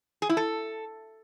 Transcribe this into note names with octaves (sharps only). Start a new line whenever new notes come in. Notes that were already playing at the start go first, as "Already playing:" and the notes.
G#4
E4
A4